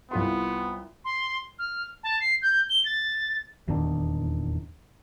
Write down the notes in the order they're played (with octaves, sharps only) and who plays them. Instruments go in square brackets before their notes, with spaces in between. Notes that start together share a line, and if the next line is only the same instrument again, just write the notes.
[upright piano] C2 F4 C6 [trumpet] B3
[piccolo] C6
F6
A5
C7
G6
G7
A6
[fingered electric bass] D#1 E2 D#3 D4